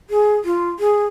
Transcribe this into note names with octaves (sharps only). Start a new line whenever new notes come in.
G#4
F4
G#4